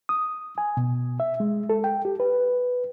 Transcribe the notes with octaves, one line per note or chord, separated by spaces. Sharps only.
D#6
G#5
B2
E5
G#3
A4
G5
G4
B4